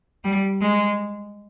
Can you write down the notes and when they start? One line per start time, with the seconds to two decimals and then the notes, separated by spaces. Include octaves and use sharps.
0.24 G3
0.62 G#3